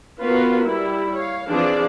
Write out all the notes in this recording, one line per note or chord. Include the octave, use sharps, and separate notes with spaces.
B3 C#4 F4 F#4 A#4 B4
G3 E4
C#5 F5
E3 F3 C4 D4 G#4 D5